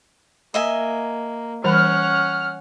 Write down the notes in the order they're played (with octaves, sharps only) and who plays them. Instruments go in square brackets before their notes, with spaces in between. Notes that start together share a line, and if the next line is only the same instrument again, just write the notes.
[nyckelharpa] A#3 [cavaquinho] D#5 E5 G#5
[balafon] E3 G3 [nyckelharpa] C#4 F#5 [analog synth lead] F6